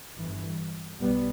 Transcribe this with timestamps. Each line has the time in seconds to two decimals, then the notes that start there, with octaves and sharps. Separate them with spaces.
0.17 G1 G2 E3
1.00 B1 B2 G3 B3